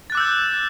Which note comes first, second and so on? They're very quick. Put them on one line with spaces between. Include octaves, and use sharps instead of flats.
A6 F#6 D6 E6 G6